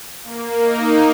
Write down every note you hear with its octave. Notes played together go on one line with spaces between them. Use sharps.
A#3
D#4